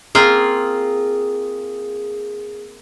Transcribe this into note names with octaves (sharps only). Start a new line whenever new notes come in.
A#3 C4 F4 G#4